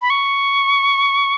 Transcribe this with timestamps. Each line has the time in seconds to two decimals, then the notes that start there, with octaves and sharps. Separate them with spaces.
0.02 B5
0.10 C#6